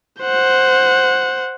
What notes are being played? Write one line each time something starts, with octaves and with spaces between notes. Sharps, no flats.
C5 F#5